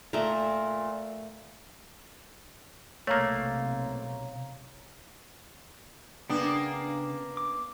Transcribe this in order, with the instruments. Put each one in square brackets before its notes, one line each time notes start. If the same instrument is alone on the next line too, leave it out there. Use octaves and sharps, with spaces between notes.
[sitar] A#2 [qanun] A3 A#4
[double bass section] B1 C3 [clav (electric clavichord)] A3 A#3 [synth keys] C#5 F5 A#5
[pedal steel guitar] C#3 G5 D#6 [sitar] A#3 D4 [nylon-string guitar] B3
[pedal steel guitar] D6